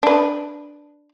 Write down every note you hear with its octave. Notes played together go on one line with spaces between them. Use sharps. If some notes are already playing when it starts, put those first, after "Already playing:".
D4 B4